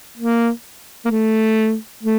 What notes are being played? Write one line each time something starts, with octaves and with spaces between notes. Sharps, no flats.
A#3
A#3
A3
A3